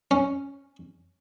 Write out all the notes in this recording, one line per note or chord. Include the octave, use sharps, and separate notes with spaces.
C#4